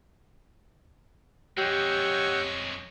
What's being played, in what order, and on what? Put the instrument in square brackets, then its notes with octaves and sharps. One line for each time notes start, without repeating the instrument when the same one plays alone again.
[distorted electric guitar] F2 G#3 [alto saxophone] G4 [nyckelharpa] C#5 D#5 [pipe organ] F#5 E6 G6